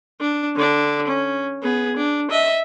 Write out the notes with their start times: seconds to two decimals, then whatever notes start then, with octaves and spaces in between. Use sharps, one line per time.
0.20 D4
0.56 D3 D4
1.08 C#4
1.62 B3 G#4
1.97 D4
2.30 D#5 E5